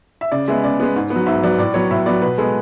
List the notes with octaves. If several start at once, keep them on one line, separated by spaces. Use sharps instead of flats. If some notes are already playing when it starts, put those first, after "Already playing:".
E5
C#3 D5
G#3 B3 E5
C#3 D5
G#3 B3
G#2
B3
F#3
G#2 E5
F#3 B3 D5
A2 D5
F#3 B3 C#5
A2 E5
F#3 B3 D5
B2 B4
G#3 B3 A4